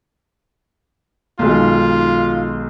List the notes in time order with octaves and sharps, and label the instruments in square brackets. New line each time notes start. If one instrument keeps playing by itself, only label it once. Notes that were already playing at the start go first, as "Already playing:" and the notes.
[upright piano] B1 D#3 G#3 [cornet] F4